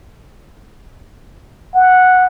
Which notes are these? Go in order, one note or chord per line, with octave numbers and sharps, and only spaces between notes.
F#5